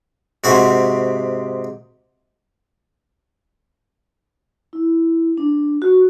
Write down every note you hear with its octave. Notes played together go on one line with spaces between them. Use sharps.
G#2 C3 C4 F#4 F#5 C#6
E4
D4
F#4